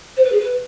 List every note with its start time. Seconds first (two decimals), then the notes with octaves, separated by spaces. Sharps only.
0.16 C5
0.24 B4
0.32 G#4
0.39 B4